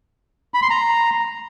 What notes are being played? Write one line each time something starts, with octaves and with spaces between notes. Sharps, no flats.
B5
C6
A#5